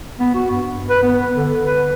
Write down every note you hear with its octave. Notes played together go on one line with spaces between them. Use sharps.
B3
F#4
G2
B4
B3
D3
B4